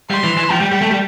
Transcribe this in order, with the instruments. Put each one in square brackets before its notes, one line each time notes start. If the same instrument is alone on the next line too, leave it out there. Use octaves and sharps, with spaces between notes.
[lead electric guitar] G3 [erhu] C6
[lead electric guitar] E3
E3
[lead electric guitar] F3 [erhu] G5
[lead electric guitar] G3
G3
A3
G3